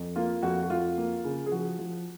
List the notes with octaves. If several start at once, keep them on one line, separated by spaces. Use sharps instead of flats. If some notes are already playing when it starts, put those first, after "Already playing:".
Already playing: F2
A#3 F4
F2 F#4
F#4
F2 F4
A#3
C#3
G#4
F3 F#4
F3